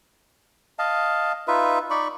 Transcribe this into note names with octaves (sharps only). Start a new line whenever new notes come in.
D#5 F5 A5
D#4 F4 B4 E5
D#4 D5 B5 C#6